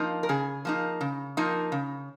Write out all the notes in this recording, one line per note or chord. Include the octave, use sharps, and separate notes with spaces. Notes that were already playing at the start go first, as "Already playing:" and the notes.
Already playing: F3 A#3 D#4
A#4
C#3 G#4
F3 A#3 D#4
C#3
F3 A#3 D#4
C#3